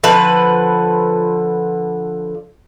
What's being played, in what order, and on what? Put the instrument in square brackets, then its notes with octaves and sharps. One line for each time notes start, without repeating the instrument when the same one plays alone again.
[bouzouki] D3 F3 B4